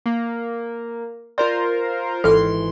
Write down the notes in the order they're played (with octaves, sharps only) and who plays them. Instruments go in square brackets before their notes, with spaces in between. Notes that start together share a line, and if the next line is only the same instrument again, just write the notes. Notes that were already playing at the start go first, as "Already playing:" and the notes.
[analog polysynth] A#3
[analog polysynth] F4 A#4 C5 [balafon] D5
[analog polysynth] G#1 E3 C6 [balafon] A4